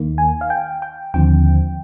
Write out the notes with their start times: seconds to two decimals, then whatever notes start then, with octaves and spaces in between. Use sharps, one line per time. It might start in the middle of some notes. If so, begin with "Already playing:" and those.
Already playing: D#2 D#3 A#3
0.18 G#5
0.41 F5
0.50 G5
0.82 G5
1.14 D#2 D3 F3 C4 G5